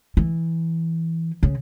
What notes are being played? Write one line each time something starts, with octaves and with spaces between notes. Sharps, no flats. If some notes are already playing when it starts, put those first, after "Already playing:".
E3
C#3